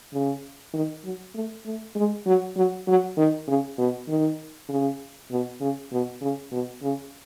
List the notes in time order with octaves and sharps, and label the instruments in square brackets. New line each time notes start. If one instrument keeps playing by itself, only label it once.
[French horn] C#3
D#3
F#3
A3
A3
G#3
F#3
F#3
F#3
D#3
C#3
B2
D#3
C#3
B2
C#3
B2
C#3
B2
C#3